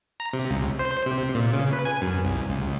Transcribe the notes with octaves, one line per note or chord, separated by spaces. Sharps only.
A#5
C3
C#2
C5
C3
A#2
C#3
B4
G#5
F#2
C2
C#2